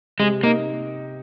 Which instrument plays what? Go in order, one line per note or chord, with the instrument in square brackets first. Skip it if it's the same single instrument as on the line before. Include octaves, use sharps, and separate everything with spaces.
[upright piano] C3 [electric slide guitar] G#3
[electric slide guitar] A#3 [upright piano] D#4